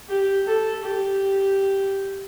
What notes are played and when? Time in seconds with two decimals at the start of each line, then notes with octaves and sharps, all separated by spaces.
0.09 G4
0.47 A4
0.84 G4